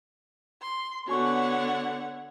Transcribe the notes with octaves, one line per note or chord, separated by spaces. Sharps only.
C6
D3 B3 F#4 C#5 F#5 G#5 C#6